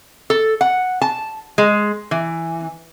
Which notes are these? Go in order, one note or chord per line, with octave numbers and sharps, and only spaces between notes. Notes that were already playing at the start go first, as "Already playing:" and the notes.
A4
F#5
A5
G#3
E3